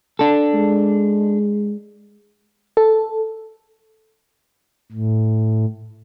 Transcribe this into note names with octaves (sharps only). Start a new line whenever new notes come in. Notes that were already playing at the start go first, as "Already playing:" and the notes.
D4 A4
G#3
A4
A2